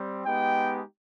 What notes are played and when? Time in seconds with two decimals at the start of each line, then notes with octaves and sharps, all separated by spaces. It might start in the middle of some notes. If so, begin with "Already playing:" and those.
Already playing: G3 C4
0.26 G#3 B3 D#4 G4 G5